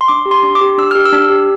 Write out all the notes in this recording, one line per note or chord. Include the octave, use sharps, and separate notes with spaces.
C6
D4 D6
G4
C6
D4
D6
G4
D4 E6
G4 F6
E6
D4
G4